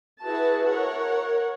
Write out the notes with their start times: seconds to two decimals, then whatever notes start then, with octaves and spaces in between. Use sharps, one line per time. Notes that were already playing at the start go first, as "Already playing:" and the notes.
0.24 E4 F#4 G#4 B4 A5
0.70 A#4 C#5 F#5